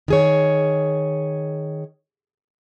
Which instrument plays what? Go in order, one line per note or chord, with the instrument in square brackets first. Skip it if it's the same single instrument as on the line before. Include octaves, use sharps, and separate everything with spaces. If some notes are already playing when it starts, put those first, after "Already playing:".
[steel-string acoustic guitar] D#3 G#4 C#5